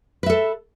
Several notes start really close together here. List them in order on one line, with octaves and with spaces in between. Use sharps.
B4 E5 A4